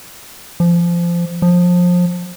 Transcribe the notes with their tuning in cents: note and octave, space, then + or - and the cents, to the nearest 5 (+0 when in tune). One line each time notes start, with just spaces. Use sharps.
F3 -20
F3 +25